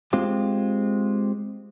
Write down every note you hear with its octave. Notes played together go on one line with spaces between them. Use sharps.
G#3 C4 F4 G4